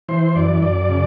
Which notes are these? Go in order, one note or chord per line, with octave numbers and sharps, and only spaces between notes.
E3 C5
F#2 D5
F#2 D5
C#3